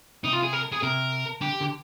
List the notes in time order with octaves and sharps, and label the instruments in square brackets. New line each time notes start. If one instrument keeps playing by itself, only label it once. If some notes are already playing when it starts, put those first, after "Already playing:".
[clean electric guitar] C3 [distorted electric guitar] D#4
[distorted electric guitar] F4
G#4
A#4
G#4
[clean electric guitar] C3 [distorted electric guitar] A#4
[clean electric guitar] D3 [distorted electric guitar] G4
[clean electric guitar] D3